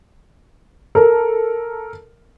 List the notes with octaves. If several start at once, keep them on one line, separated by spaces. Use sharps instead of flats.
A4 A#4